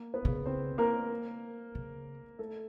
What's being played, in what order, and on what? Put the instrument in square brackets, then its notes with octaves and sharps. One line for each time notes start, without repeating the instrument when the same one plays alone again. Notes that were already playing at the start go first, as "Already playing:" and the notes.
Already playing: [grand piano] A#3
B3 B4
[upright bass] C#3
[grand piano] C4 C5
A#3 A#4
[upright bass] C#3
[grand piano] A3 A4